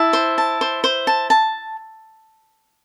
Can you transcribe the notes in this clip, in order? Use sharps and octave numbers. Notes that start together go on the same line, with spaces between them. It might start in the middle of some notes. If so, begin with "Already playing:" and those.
Already playing: E4 A5
C5
A5
C5
C5
A5
A5